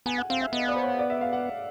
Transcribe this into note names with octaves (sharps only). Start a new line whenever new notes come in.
B3 G#5
F#5
C4 F5
E5
B3 D#5
D5
C5
C#5
D5
E5
F5
F#5